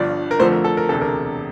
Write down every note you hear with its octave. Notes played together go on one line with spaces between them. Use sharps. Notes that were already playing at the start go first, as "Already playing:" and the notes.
Already playing: G1 G2 F3 D5
A#4
F2 D3 F3 A3 C5
A#4
A4
A#4
E1 D2 C3 A4
A#4